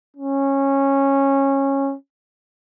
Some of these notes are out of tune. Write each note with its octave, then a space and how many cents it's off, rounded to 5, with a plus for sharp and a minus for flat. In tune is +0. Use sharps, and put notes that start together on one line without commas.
C#4 -15